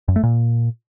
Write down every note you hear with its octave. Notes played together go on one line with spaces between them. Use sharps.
F#2
A3
A#2